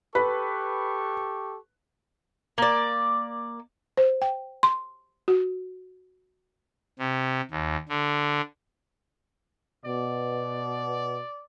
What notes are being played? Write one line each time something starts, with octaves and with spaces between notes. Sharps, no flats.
G4 A4 B4 C#6
A#3 D5
C5
G5
C6
F#4
C3
D#2
D3
B2 D5